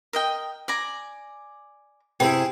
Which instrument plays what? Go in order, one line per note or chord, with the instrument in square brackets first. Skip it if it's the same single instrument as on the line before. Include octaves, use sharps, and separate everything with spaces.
[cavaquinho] A#4 D#5 G5
D5 G#5 A#5
[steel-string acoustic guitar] C3 [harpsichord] E4 G#4 B4 [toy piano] G5